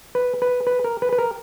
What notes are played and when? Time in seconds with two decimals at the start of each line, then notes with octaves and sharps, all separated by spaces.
0.15 B4
0.42 B4
0.67 B4
0.84 A#4
1.02 B4
1.13 B4
1.18 A#4